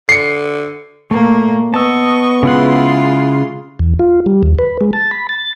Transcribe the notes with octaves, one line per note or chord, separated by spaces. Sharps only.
D3 C7 C#7
A#2 A3 A#3
B3 D#5 A5 C#6 E6
C#3 G#3 E4 F4 F#5 C6
E2
F4
G3
D#2
B4
G#3
A5
B5
A6